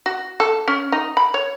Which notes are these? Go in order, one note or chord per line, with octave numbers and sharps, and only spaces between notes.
F#4
A4
C#4
D#4
B5
C#5